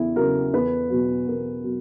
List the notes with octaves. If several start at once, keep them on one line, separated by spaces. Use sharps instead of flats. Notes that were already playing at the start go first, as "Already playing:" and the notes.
Already playing: E2 C#3 E4
C#3 F#3 A#4
E2 B4
B2 F#3
E2 A#4
B2 F#3